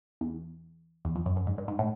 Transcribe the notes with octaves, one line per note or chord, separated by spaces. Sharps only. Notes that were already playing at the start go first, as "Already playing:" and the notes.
E2
E2
F2
F#2
F#2
G#2
G2
G#2
A2